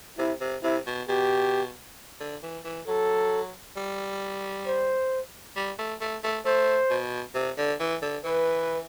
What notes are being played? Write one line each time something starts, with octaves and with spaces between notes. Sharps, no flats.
C3 E4
C3
C3 E4
B2
B2 G4
D3
E3
E3
F#3 A4
G3
C5
G3
A3
A3
A3
A3 C5
B2
C3
D3
E3
D3
E3 B4